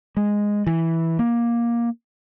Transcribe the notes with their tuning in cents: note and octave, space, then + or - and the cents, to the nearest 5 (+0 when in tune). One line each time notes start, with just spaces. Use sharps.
G#3 -5
E3 -5
A#3 +15